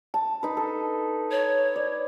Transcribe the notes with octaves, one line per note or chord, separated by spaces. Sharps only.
A5
D#4 B4
A4
C#5
D5